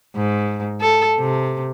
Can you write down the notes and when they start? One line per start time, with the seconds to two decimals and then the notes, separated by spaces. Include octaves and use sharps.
0.16 G#2
0.81 A4
1.18 C3